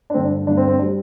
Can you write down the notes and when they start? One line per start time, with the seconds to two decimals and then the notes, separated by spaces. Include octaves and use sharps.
0.10 D4
0.14 G2 D3 A3 C4
0.25 D4
0.46 G2 D3 A3 D4
0.57 C4
0.68 C4
0.79 D4
0.82 G3